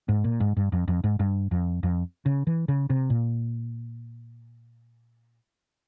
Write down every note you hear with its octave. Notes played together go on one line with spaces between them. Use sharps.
G#2
A#2
G#2
G2
F2
F2
G#2
G2
F2
F2
C#3
E3
C#3
C3
A#2